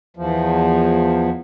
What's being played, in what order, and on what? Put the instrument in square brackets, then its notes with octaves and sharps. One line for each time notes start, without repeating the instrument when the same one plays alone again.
[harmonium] E2 F3